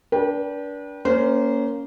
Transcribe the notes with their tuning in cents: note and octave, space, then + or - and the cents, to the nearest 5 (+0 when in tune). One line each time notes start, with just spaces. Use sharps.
D4 -25 B4 -40 G5 -10
A#3 +0 C#4 +10 C5 -25